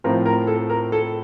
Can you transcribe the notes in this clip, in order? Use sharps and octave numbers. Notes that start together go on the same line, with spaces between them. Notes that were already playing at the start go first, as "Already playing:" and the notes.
A2 F3 C4 A#4
A#4
A4
A#4
A4